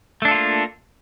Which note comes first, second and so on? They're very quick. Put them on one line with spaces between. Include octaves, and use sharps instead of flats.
A3 D4 A4 F4 A#3